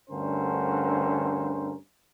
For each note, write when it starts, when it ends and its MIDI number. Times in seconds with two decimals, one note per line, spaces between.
0.10 1.74 38
0.10 1.74 43
0.10 1.74 50
0.10 1.74 61
0.10 1.74 70
0.10 1.74 72